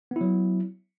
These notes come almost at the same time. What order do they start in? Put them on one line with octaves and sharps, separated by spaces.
B3 E4 F#3